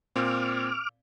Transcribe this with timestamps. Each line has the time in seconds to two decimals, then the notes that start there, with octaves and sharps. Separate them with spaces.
0.16 A#2 C4 D6 F6